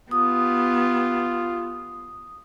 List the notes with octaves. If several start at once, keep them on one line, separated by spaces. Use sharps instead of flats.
B3 F4 G4 D#6